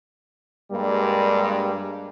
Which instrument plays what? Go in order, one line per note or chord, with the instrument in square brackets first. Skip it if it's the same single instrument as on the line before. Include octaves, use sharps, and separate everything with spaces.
[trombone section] G2 G3 G#3 A#3